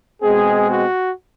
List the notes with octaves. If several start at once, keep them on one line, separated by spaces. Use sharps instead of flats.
B2 G#3 C4 G#4
F#4